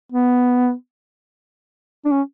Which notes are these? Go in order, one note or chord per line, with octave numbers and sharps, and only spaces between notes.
B3
D4
C#4